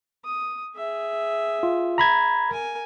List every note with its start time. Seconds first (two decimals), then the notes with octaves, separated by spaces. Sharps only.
0.25 D#6
0.76 G#4 E5
1.63 F4
1.98 A#5 B5 G#6
2.49 A#4 G#5